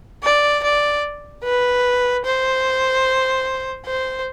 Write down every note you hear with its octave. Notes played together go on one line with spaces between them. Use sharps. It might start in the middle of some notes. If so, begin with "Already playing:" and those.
D5
D5
B4
C5
C5